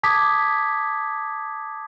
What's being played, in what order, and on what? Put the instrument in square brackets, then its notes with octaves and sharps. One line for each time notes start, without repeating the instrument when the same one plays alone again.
[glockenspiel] A5 D6 D#6 G#6 B6